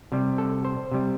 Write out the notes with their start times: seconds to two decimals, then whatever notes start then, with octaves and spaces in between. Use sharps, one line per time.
0.12 C3 G3
0.38 A4
0.65 C5
0.91 C3 G3